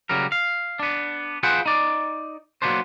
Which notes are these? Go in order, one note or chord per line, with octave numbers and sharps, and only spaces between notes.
C#3 F#3 G3 A#4
F5
B3 D4
F4 G#4 B4 C5 F#5 G5
D#4 D5
F#3 G#3 A#3 B3 D4 C5